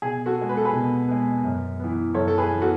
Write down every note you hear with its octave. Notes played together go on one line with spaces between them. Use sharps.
B2 G#4
F#4 A4
G#3 B3
B4
A4
G#4 B4
B2
G#3 B3
F#2
E3 B3
F#2 A4 C#5
A4
G#4 B4
E3 B3
F#4 A4